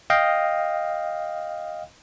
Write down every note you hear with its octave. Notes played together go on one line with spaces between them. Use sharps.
D#5 F5 G5